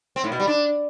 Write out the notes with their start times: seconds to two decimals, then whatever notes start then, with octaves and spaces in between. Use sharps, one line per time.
0.16 C4
0.24 A2
0.32 B2
0.40 G3
0.47 D4